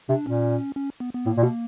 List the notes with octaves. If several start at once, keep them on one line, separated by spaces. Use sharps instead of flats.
C3 D4
A#2 C#4
C#4
B3
B3
A2 A#3
A#2
B2